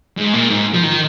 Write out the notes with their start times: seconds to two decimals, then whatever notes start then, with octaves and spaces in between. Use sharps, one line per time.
0.17 G#2
0.33 A#2
0.50 G#2
0.74 F3
0.83 D#3